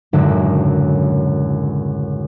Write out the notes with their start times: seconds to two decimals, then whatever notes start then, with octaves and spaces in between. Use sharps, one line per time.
0.13 G#1 C#2 F#2 A2 D3 F#3